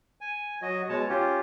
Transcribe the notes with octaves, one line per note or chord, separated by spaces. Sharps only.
G#5
F#3 F#4 D#5
B2 G#3 C#5 A5
C#4 F4 G4